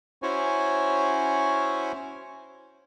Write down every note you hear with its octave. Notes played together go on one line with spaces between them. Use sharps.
C#4 E4 F#4 C5 C#5 G#5